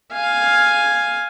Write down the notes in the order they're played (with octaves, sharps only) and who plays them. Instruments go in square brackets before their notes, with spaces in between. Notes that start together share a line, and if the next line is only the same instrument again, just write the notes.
[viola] F5 G#5